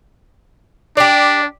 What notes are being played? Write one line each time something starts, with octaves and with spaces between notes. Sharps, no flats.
D4 G4 D5